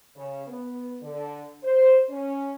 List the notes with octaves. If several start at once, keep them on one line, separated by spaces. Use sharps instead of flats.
C#3
B3
D3
C5
C#4